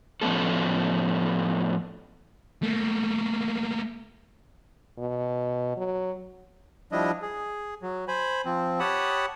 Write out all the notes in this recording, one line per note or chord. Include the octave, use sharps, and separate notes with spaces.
A2 F3 A3 B3 C#4 A4
A3 A#3
B2
F#3
F3 G3 D4 E4 D#5
G#4
F#3
C5 G#5 B5
F3 C4
G4 C#5 F#5 A5 B5 D#6